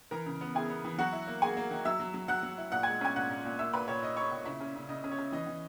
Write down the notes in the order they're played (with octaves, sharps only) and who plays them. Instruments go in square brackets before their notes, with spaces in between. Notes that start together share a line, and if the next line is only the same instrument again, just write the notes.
[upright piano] E3 A#4 A#5
C#3
B3
E4 G#4 G#5
B3
E3
F#3 F#4 F#5
E4
A#3
A#3 G#4 G#5
A#3
D#3
F#3 E5 E6
F#3
F#3
F#3 F#5 F#6
F#3
E4
A#2 F#5 F#6
G#3 G#5 G#6
C#4 G#5 G#6
A#2 F#5 F#6
A#2
A#2
A#3 E5 E6
A#2 B4 B5
A#2 C#5
D#4 D#5
D#4 C#5 C#6
A#2
C#3 E4 E5
C#4
C#3
C#3 D#5
C#4
C#5
C#4
E3 D#5
E3